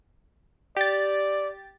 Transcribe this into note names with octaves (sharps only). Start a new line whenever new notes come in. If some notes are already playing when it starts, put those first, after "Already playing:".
G4 D5 A6